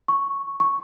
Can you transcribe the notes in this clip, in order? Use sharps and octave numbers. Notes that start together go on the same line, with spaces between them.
C#6
C#6